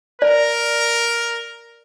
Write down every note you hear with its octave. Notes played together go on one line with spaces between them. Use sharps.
A#4 D5